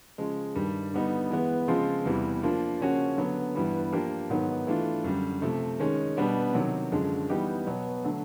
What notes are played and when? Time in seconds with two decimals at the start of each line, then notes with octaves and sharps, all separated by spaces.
0.18 C#3 F3 G#3
0.55 G2 D#3 G3
0.93 D3 G3 B3 D#4
1.31 E3 G#3 B3
1.68 C#3 F3 G#3 C4 F4
2.05 E2 C3 E3 G3
2.43 F3 A#3 D4 F4
2.80 C#3 F3 A#3 C#4 F#4
3.17 D3 F#3 B3
3.55 G2 E3 G3 B3
3.93 F3 A#3 D4 G4 A#4
4.30 G#2 D#3 F#3 B3
4.67 E3 A3 D4 F4
5.04 F#2 D3 G3
5.42 C3 F3 A3
5.80 D#3 G#3 C#4
6.17 B2 G3 B3 D4
6.54 C3 D#3 F#3
6.92 F#2 D3 F3 G#3
7.29 E3 G3 B3 D#4 G4
7.67 B2 F#3 B3
8.04 D3 F#3 A3